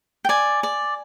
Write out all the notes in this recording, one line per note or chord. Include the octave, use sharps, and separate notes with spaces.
G5
D5 G#5
D5